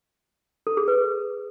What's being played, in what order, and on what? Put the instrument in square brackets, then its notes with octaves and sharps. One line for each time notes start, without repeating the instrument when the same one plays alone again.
[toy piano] A4
G#4
B4